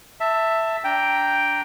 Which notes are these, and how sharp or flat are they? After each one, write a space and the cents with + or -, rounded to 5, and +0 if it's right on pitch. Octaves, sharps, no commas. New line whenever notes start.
E5 +0 A5 +15
D4 -15 G5 +0 A#5 +0